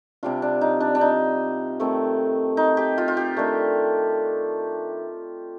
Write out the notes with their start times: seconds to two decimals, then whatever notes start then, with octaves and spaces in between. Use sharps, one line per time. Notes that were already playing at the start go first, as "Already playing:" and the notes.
0.23 C3 G3 D4 F4
0.42 D4
0.61 D#4
0.80 D4
0.95 D4
1.01 D#4
1.80 D#3 A3 C4
2.57 D#4
2.77 G4
2.98 F4
3.08 F4
3.17 G4
3.37 D#3 A3 D4